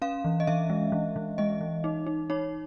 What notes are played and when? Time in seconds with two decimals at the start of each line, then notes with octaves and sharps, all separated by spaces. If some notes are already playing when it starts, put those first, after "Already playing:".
0.02 C#4 F5
0.25 E3
0.40 D#5
0.47 E3 E5
0.70 G#3
0.92 E3
1.16 E3
1.38 G#3 D#5
1.61 E3
1.84 D#4
2.07 D#4
2.30 D#4 C#5